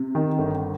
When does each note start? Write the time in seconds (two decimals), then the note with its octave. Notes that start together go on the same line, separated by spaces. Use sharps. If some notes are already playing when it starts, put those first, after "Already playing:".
Already playing: C3
0.15 D#3
0.39 G1